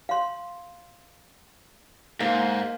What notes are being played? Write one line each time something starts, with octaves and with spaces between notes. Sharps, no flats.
F5 C6
G#2 A#3 F5